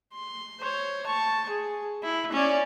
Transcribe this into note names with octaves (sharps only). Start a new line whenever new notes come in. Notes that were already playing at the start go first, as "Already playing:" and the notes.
C6
C5 C#5
A5 C#6
G#4
E4
C#4 D5